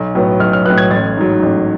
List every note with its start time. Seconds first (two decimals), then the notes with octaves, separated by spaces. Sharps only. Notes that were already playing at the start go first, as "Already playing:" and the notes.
Already playing: B1
0.15 A2 F#3 B3
0.39 B1 F6
0.53 F6
0.65 A2 F#3 B3 F#6
0.78 G#6
0.91 A1 A6
1.17 G#2 F#3
1.43 A1